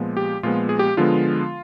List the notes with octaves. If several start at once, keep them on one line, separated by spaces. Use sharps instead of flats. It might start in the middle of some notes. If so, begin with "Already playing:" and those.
Already playing: A#2 F3 G#3 B3
G4
A#2 F3 G#3 B3 F4
G#4
G4
D3 F3 G#3 B3 F4